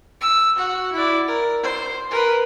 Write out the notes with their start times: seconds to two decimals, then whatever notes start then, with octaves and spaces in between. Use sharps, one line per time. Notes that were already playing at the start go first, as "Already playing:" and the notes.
0.21 E6
0.56 F#4 F#5
0.93 E4 D5
1.28 A#4
1.63 C5
2.11 A#4 B4